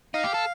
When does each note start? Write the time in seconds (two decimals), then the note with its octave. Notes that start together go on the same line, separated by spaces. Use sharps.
0.14 D#4 F5
0.24 G4
0.34 A4